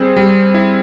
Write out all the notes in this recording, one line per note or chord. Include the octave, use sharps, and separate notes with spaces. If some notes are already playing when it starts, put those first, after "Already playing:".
Already playing: G3 C4 G#4 C5
G3
E4